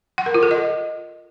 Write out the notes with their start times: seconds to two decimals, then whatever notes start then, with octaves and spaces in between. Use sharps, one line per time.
0.18 F#5
0.26 A#4
0.34 F4
0.43 A4
0.51 D#5